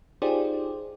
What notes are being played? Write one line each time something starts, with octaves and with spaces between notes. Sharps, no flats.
D#4 F4 G4 G#4 C5 D5